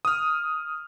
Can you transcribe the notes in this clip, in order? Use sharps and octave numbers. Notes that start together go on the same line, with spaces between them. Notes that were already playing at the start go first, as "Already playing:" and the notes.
D#6 F6